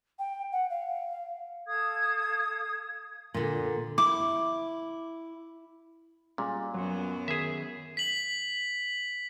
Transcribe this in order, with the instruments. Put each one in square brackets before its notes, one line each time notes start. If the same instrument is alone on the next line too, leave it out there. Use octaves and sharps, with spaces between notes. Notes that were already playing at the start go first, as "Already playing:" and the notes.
[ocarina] G5
F#5
F5
[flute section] A4 F5 D#6 G#6
[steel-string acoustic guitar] A#2 D3
[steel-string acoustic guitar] E4 [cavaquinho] D6
[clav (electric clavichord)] A#2 [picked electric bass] G3 G#3 C#4
[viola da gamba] F#2 B3 [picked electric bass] F#3
[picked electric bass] D#3 [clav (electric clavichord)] G#4 E5
[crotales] B6 F#7